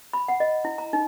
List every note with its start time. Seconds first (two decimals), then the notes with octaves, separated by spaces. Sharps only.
0.13 B5
0.28 F#5
0.40 D#5
0.65 E4
0.78 A#5
0.93 D#4